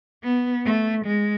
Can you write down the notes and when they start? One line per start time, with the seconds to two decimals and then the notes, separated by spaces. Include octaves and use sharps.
0.24 B3
0.65 A3
1.06 G#3